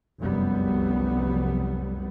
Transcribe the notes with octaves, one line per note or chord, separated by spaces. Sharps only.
F1 C2 F#2 G3 B3